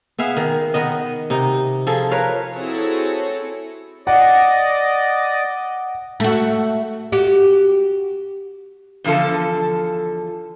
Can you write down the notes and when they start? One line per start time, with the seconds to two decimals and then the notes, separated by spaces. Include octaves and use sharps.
0.18 B3 G#4 E5 F5
0.37 D#3
0.74 D#3 B3 D#5
1.30 C3 D#4
1.87 F3 G#4 A4
2.11 A#4 B4 C#5 F5
2.55 C4 E4 F#4 G#4 A4 C#5
4.07 D5 D#5 F#5
6.20 A3 F#4
7.12 F#4 G4
9.04 E2 A#2 D3 F3 A4